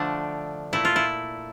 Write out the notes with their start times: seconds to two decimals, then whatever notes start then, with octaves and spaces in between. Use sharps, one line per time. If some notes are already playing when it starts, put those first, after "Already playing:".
Already playing: D3 F3 A3 D4
0.73 A#2 A3 E4
0.85 F4
0.96 E4